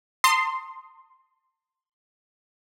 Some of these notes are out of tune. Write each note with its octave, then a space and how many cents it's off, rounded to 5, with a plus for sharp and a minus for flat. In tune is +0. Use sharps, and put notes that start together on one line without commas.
A5 +45 C6 +0 D#6 +0